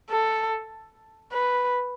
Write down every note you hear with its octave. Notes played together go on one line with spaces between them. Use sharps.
A4
B4